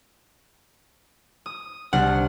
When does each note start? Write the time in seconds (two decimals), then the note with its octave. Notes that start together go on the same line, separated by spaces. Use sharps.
1.46 D#6
1.93 C2 D4 F#5 F6